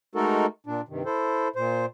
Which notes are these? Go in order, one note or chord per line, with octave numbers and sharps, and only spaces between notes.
G#3 A3 D#4 F#4 A4 A#4
A#2 D4
G2 C3 D#3
E4 A4 C5
A#2 C5